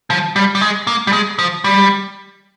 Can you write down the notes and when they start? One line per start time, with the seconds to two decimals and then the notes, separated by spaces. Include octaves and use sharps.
0.10 F3
0.36 G3
0.55 G3
0.61 G#3
0.87 A#3
1.07 G3
1.13 G#3
1.39 F3
1.64 G3